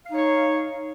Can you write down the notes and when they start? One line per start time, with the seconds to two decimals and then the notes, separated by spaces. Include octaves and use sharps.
0.06 F5
0.10 D#4
0.15 C#5